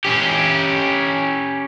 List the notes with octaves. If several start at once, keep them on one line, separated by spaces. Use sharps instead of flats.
C#4 G4